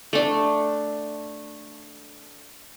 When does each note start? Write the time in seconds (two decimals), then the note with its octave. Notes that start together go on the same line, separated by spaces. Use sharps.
0.13 A3 D4